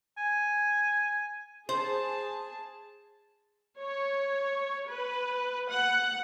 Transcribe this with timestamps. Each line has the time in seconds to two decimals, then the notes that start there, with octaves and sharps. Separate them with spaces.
0.18 G#5
1.69 G#4 C5 A5
3.80 C#5
4.88 B4
5.69 F#5